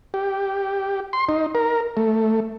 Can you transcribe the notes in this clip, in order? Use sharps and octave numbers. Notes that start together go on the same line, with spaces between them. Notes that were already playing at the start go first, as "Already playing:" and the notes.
G4
C6
D#4
A#4
A3